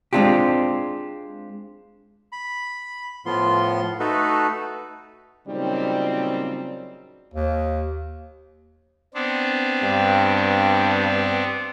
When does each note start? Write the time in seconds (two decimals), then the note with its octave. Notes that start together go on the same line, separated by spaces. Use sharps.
0.13 G#3 C4 D4 F4 G4
2.32 B5
3.26 A2 F3 B3 F4 C6
4.00 A3 D#4 F#4 A4 B4
5.48 A#2 C#3 F#3 G3 C4 D#4
7.34 D#2
9.14 B3 C4 D4
9.83 G2